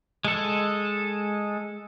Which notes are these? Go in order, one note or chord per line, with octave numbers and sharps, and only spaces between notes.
G#3 A4